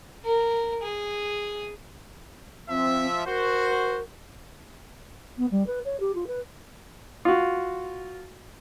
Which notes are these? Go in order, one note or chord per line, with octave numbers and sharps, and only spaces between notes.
A#4
G#4
F3 C4 E5
F#4 A#4 C5
B3
G3
B4
C#5
G4
F4
B4
F4 F#4